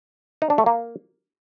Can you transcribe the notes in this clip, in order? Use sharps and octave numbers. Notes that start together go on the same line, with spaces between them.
D#4
D4
A3
A#3